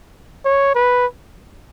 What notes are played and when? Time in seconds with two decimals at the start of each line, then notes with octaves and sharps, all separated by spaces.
0.45 C#5
0.75 B4